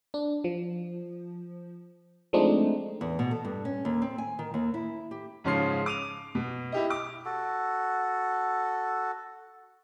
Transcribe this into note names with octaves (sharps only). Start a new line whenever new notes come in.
D4
F3
F3 G#3 A3 C4 D4 D#4
E2
B2
A4
G2
C#4
D#2
C4
G#5
D#3
D#2
E4
G4
G#2 C#3 F3 C#4 C6 C7
D6 D#7 F7
B2
E4 G4 D#5
D6
F#4 A4